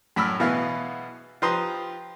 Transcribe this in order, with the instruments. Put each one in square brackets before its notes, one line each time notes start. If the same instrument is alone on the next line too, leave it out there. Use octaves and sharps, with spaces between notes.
[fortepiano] F#2 A2 B5 E6 F6
B2 E3 B3 G#4 E5 F5
F3 G4 B4 A#5 C6 D#6